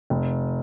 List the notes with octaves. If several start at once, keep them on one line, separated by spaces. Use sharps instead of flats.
F1